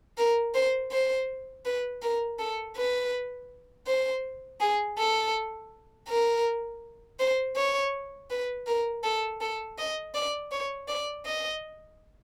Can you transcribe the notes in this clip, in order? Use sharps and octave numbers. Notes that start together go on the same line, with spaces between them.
A#4
C5
C5
B4
A#4
A4
B4
C5
G#4
A4
A#4
C5
C#5
B4
A#4
A4
A4
D#5
D5
C#5
D5
D#5